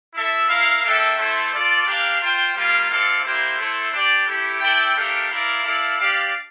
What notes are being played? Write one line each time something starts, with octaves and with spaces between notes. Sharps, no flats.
E4 A4 E5
E4 A#4 F5
A#3 D4 A4 E5 G5
A3 E4 A4 C5
F4 A4 D5
D4 G4 A#4 F5
F4 C5 G5
G3 A#3 F4 A#4 F5
C4 E4 A4 D5 F5
A#3 E4 G4 C5
A3 E4 A4 C5
D4 G4 D5
A3 E4 G4
E4 A4 D5 G5
A3 D4 G4 A#4 F5
E4 A#4 D5 F5
E4 A4 D5 F5
D4 G4 D5 F5